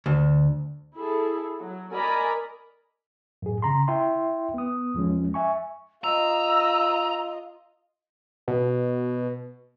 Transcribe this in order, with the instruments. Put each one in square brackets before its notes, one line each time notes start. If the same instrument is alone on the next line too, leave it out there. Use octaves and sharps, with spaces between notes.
[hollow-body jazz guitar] D2
[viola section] E4 G#4 A4
F#3
A#4 D5 D#5 G#5 A#5 B5
[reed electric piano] F#2 A2 G#4
C#3 A#5 C6
E4 E5 G5 C6
B3 D#6
E2 F3 G#3 C#4
E5 G#5 C#6
[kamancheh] F4 D#5 [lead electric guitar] A#5 [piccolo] E6
[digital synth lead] B2